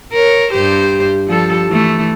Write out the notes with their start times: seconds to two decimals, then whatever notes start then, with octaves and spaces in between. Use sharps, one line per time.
0.12 A#4 C#5
0.52 G2 G4 C5
1.28 F3 G3 A4
1.68 E3 A3